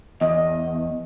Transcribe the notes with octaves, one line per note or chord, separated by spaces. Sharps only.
E2 D#5